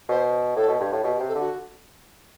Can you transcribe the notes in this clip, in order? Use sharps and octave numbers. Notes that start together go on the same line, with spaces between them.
B2 C5
A2 A4
B2
G2
A2
B2 G4
G4
C3
A4
D3 F#4